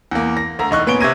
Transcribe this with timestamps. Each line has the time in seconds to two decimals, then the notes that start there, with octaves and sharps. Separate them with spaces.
0.11 E2 A#3
0.37 A#6
0.59 D2 A#5
0.71 E1 D#4 C#6 F#6
0.86 A#2 B3 C#4 D7 G7
1.01 C3 G4 C#6 G#6 A#6 D#7